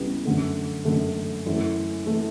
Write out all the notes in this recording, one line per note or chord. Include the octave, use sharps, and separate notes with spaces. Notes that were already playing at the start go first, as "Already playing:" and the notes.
Already playing: C#2 C#3 G3 B3 E4
F#2 D3 A3
F#2 D3 A3
F#2 E3 A3
E3 A3